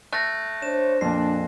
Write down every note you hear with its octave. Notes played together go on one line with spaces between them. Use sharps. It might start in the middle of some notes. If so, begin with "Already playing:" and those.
A3 F#6 A#6
D4 C5 C#5 E7
F2 A#2 D4 C7